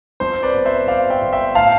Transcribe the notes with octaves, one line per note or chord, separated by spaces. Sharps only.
F2 C5
B4 D5
G1
C5 E5
G1 D5 F5
E5 G5
G1
E5 G5
A2 F5 A5